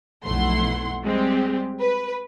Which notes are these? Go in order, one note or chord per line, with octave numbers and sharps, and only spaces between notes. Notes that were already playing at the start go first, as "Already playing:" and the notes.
B1 F2 A3 E4 F#5 C6
G3 G#3 C4 G4
B4